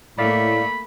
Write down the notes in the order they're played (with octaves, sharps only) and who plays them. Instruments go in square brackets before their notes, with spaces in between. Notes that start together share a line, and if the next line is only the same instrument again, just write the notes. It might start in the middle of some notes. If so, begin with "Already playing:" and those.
[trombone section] A2 [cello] A3 A#3 [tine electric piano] D5 F5 [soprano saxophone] B5